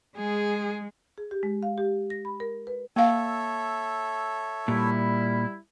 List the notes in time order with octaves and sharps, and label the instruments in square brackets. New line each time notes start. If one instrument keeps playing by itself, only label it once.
[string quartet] G#3 [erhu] G#4
[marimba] G#4
G4
G#3
F5
G4
A#6
B5
A#4
B4
[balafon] A#3 F5 [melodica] A4 C#5 E5
[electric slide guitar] A#2 [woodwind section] G3 E4